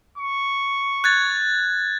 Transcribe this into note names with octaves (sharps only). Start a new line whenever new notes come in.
C#6
F#6 G#6 A6